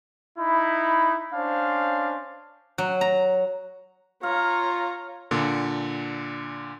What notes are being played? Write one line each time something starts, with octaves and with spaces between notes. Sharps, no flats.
D#4 E4 B5
C#4 D4 C5 F5
F#3
A#5
F4 C#5 F5 A#5
A#2 D3